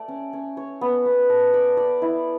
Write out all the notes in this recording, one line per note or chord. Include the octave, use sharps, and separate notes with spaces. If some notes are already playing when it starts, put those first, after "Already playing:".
Already playing: A3 D5
C#4
C#4
C#5
B3
B3
A4
D5
D5
E4